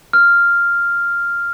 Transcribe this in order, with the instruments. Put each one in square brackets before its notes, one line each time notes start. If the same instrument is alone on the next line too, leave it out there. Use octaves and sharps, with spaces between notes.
[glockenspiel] F6